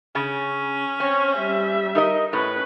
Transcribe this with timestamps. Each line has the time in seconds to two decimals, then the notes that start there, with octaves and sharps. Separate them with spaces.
0.15 C#3 C#4
1.00 C4 C#5
1.36 G3 E5
1.95 D#4 A#4 D#5
2.33 A2 C#4 B4